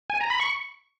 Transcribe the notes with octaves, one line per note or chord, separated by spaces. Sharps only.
G#5
A#5
B5
C#6